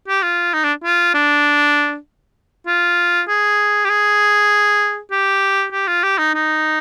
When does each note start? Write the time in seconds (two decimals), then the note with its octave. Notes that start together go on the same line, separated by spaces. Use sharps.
0.08 G4
0.23 F4
0.53 D#4
0.64 D4
0.84 F4
1.14 D4
2.67 F4
3.28 G#4
3.85 G4
3.90 G#4
5.11 G4
5.72 G4
5.88 F4
6.03 G4
6.18 D#4
6.34 D#4